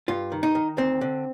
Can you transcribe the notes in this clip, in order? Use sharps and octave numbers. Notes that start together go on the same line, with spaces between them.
G2 F4
D#3
D#4
D#3
D2 C4
D3